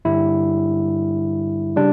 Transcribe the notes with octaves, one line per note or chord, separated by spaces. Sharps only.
G2 D3 G3 E4
C#3 G3 D4